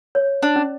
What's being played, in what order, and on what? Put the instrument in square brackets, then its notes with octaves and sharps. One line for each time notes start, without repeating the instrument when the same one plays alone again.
[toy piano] C#5
[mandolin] D4
[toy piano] C#4